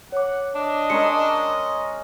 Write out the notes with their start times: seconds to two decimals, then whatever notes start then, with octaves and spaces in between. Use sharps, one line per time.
0.12 C#5 F#5 D6
0.55 D4 D#5
0.90 G#3 C#4 A#4 C#7